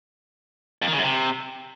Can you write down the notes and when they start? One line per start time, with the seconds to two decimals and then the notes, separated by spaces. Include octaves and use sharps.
0.82 F2
0.87 D#3
0.93 C#3
0.98 F#2
1.04 C3